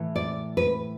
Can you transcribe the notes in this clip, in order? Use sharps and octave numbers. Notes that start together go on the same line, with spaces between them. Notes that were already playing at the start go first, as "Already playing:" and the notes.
Already playing: A2 E3
D5
B4